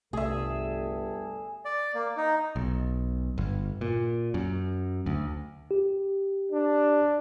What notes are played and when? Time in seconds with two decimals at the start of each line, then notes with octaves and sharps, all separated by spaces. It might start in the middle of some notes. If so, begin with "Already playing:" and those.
0.13 G1 C2 G3 A3 G#4 A4 E5
1.65 D5
1.95 A#3
2.17 D#4
2.56 B1
3.38 G1
3.81 A#2
4.34 F#2
5.06 D2
5.71 G4
6.52 D4